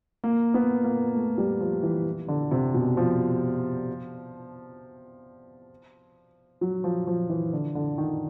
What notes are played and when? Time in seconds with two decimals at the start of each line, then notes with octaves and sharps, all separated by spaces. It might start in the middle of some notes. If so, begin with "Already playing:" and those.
0.24 A#3
0.54 B3
0.84 A#3
1.15 A3
1.38 G3
1.60 F3
1.83 E3
2.28 D3
2.51 C3
2.74 B2
2.97 F3
6.61 F#3
6.84 F3
7.07 F3
7.30 E3
7.53 D3
7.75 D3
7.98 D#3